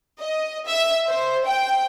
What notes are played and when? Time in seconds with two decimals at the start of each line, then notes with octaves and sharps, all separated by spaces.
0.21 D#5
0.66 E5
1.07 C5
1.46 G5